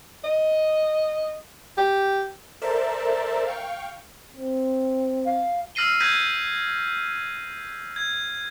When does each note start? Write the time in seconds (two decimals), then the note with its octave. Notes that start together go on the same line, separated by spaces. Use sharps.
0.24 D#5
1.77 G4
2.62 A4 A#4 C5 D5 E5 A5
3.46 F5 G5 C#6
4.34 C4
5.25 F5
5.75 E6 F6 A#6 C7 D#7 G7
6.00 E6 G6 G#6 A#6 B6 D#7
7.96 G#6